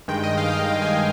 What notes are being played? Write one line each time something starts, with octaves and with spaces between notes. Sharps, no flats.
G2 D#3 G#3 G5
D#5
F5
G5
F5
G5
G#5